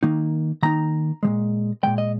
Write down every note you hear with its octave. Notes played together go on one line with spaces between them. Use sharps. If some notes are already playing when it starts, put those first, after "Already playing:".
D#3 A#3 D#4
D#3 A#3 D#4 A#5
A#2 F3 G#3
A#2 F3 G#3 G5
D#5